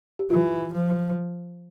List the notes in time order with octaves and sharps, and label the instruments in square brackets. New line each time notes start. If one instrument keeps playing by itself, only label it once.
[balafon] G4
[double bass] E3 [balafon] F4
[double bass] F3